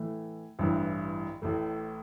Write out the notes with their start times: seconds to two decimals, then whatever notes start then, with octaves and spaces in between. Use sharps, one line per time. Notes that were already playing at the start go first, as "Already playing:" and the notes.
Already playing: A2 E3 A3
0.59 A1 G2 E3
1.42 A1 A2 A3